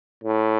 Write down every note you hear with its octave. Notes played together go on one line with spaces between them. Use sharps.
A2